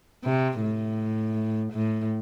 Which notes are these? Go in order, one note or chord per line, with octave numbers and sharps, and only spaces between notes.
C3
A2
A2